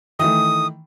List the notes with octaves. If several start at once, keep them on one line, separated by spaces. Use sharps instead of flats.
D#3 E3 A3 D#6